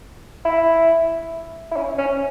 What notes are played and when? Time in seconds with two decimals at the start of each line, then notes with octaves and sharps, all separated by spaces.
0.45 E4
1.71 E4
1.76 C#4
1.98 C#4